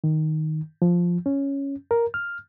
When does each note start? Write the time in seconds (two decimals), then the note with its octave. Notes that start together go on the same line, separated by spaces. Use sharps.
0.04 D#3
0.82 F3
1.26 C#4
1.91 A#4
2.14 F6